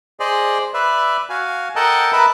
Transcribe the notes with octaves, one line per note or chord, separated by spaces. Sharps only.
G#4 C5 D5 D#5
B4 D5 E5
F#4 F5 G#5
A4 A#4 D#5 F#5 G5 A5
A#4 B4 D#5 E5 A5 B5